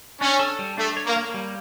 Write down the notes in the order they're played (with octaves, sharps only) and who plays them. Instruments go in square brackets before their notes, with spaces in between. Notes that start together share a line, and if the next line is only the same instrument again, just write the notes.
[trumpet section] C#4 [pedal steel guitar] D4
[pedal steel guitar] A4
G3
[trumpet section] A3 [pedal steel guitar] D4
[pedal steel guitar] C#5
[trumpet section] A#3
[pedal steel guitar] A#3
G3